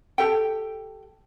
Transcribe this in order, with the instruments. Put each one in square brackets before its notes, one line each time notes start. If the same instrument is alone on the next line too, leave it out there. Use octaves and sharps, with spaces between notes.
[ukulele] G4 A4 G5